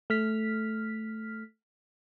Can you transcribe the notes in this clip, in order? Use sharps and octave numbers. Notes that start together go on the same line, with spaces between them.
A3 F6 B6